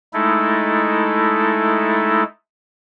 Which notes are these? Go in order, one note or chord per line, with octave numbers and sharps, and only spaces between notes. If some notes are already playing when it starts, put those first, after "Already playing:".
G#3 A3 D#4 E4 A4